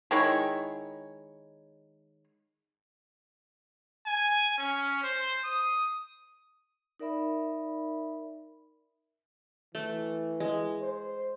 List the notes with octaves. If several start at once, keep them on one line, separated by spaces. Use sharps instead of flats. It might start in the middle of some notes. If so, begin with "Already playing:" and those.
D#3 G#3 E4 C#5
G#5
C#4
C5
D#6
D#4 A#4 D5 E5 B5
E3 A3
G#3
C5